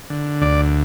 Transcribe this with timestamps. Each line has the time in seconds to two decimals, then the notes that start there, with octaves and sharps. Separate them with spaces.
0.10 D3
0.42 D2 D5